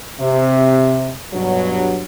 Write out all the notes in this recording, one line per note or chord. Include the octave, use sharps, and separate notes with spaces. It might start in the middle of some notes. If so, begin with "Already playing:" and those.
C3 E5
G2 B2 F#3